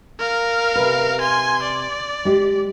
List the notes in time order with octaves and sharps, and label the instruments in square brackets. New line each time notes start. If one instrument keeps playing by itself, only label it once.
[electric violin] A#4 F5
[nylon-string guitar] C3 B4
[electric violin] G#5 C6
D5
[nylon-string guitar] G#3 G4